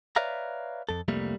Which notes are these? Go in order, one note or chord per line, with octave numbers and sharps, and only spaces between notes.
B4 C#5 D5 E5 F5 A#5
F2 A4
C2 F2 C3 G3 A3 A#3